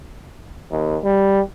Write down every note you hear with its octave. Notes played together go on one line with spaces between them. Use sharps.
D#2
G3